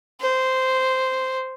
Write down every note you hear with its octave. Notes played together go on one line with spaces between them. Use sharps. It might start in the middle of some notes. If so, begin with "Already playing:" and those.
C5